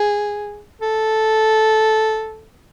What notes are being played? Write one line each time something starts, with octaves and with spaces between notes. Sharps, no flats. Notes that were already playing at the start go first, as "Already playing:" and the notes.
Already playing: G#4
A4